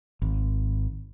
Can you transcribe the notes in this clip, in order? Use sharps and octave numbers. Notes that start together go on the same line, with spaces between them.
G#1